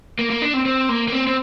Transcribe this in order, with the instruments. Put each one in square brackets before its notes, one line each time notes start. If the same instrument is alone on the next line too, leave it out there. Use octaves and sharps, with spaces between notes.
[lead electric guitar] A#3
A#3
D4
C4
C4
A#3
A#3
C4
C4